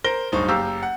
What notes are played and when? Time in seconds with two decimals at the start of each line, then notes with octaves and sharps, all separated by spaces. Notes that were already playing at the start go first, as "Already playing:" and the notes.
0.04 A#4 C5 A#6 G7
0.32 D1 G2 D#4 C5 C#6
0.48 F#1 G4 F5 A#5 E6 G6
0.83 F#5